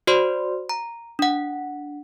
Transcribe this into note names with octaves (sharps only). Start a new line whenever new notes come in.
F#4 C5 D5 C6
A#5
D4 F#5